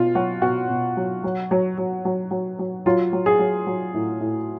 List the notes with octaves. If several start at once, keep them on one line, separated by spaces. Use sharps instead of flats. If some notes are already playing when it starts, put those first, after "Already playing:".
Already playing: B2 F4
F#3 F#4
B2 F#4
B2
F#3
F#3
F#3
F#3
F#3
F#3
F#3
F#3 F4
F#3
G#4
F#3
F#3
A2
A2